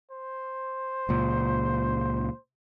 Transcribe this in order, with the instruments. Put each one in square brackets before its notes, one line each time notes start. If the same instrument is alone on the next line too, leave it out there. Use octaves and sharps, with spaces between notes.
[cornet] C5
[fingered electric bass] C#2 A#2